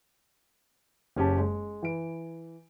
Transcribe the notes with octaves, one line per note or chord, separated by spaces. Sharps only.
F#1 C#4 G4 A5
G#3
E3 D7